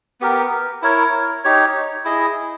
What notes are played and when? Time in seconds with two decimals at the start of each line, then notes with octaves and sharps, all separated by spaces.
0.21 B3 G4 A#4
0.82 E4 A#4 C#5
1.44 D#4 G4 C#5
2.05 E4 G#4 D#5